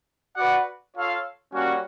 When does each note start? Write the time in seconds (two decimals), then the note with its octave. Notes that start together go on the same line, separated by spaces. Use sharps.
0.36 F#4 B4 D5 F#5
0.94 F4 A4 C#5 F5
1.53 G3 A#3 C#4 F#4